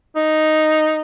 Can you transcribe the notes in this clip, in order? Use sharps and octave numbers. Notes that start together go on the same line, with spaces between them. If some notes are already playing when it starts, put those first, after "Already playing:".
D#4